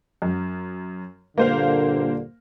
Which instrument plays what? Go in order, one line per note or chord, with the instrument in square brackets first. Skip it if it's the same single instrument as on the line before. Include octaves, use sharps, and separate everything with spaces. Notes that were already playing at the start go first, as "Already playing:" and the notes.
[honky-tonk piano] F#2
[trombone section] G2 A#2 D3 [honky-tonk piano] A#3 C5 F5